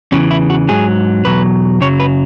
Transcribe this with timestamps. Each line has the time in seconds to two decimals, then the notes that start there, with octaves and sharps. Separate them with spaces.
0.12 E2 C#3 E3 C#4
0.31 E4
0.50 F#4
0.68 G#2 F#3 G#4
1.25 E2 B2 F#3 B4
1.81 F#2 C#3 F#3 C#5
2.00 B4